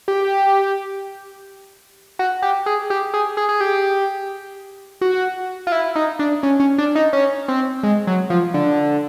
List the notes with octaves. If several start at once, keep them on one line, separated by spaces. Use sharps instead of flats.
G4
F#4
G4
G#4
G4
G#4
G#4
G#4
G4
F#4
F4
E4
D#4
D4
C#4
C#4
D4
D#4
C#4
C4
G#3
F#3
F3
D3